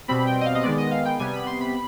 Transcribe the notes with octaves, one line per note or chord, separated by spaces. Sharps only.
B2 G3 C4 B5
G5
D#5
F5
D#5
D#3 G#3 B3 D5
D#5
F5
G5
C3 G3 B3 G#5
B5
C6
B5